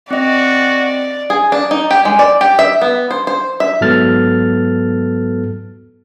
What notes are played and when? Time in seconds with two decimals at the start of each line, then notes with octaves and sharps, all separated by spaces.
0.11 C4 F#4 D5 D#5
1.30 G#4
1.52 D4
1.71 D#4
1.91 G4
2.05 G#3
2.19 D5
2.41 G4
2.59 E5
2.82 B3
3.11 C5
3.27 C5
3.60 E5
3.81 G#2 F#3 B3 A4 F6 A6